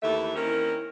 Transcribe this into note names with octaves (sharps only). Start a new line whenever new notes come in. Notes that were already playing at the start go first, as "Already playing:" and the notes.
D#2 E3 A3 A4 E5
D#3 A#3 C4 C#4 E4 A#4